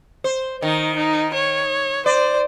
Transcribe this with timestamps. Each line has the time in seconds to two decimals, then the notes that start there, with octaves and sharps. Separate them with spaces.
0.24 C5
0.62 D#3 D#4
0.96 D#4
1.33 C#5
2.06 C5 D5